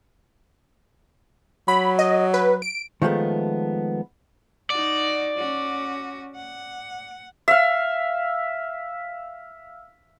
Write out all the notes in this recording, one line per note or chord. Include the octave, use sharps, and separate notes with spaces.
F#3 B5
D#5
B4
D7
D#3 F3 G#3 A3 B3
D#4 F#4 D5
C#4 F#4
F#5
E5 F5